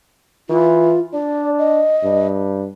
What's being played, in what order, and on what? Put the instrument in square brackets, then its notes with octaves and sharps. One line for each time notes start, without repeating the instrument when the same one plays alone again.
[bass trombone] E3 [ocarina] F4
[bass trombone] D4 [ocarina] D5
[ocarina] D#5
[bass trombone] G2